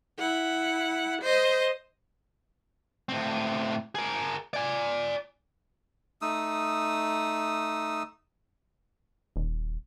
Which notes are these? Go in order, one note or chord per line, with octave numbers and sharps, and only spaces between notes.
E4 F#5
C5 D#5
A2 C4
G#4 A#4
D5 G#5
A3 D#4 D#6 E6
D#1